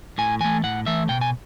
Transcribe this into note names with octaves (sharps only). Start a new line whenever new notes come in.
A2 G#5
E3 A3 G#5
A2 F#5
E3 A3 E5
B2 G5
G#5